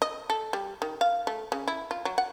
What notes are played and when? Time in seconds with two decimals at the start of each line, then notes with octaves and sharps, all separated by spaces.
0.02 D#5
0.30 A4
0.53 G3
0.82 D#3
1.01 F5
1.27 A3
1.52 C#3
1.68 E4
1.91 F4
2.05 F#3
2.18 F#5